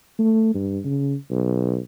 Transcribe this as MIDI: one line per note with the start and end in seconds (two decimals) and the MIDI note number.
0.19 0.50 57
0.55 0.79 43
0.84 1.15 49
1.31 1.78 35